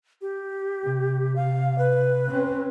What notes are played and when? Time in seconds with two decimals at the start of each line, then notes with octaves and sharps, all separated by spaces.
0.21 G4
0.84 C3
1.36 F5
1.78 B4
2.31 C4 C#4